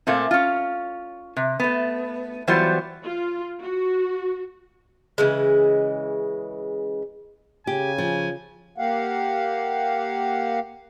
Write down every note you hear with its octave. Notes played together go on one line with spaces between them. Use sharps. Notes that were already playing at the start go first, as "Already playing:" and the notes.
A#2 A3 A#3 C4
C#4 F4
C3
A3 B3
E3 F#3 G3 B3 F4 C5
F4
F#4
C#3 E3 G#3
C#3 G4 G#5
F3
A#3 G4 F5 F#5